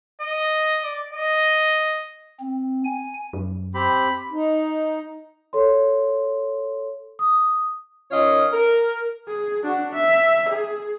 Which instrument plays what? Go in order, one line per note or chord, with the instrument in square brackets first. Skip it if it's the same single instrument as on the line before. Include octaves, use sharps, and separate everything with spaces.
[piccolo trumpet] D#5
D5
D#5
[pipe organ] C4
G#5
[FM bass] F#2
[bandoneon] C4 G4 [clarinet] B5
[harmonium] D#4
[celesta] A4 C#5 C6
D#6
[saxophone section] D#3 C#4 F4 C#5 D#5
A#4
[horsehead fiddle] G#4
D4 F#4
E5
G#4